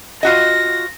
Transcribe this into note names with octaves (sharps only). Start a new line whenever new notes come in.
F4 F#4 D#5 A#6